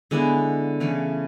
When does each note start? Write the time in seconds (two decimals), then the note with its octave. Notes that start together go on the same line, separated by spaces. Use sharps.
0.11 D3 G#3 B3 E4
0.80 C#3 E3 A3